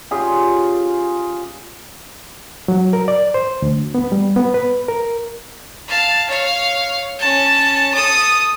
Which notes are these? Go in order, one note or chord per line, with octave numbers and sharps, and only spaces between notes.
C#4 F4 G4 G#4
F#3
A#4
D5
C5
D2
B3
G3
B3
B4
A#4
F5 A5
C#5 F5
C#4 A5
A4 D#6